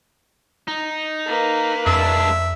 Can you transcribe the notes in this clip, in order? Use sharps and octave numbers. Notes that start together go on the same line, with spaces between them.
D#4
A#3 B4
F2 G#3 D4 E5